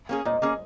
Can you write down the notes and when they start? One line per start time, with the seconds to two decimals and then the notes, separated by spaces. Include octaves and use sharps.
0.09 A#3 C#4 G#4
0.25 A#2 D#5
0.42 A#3 C#4 G#4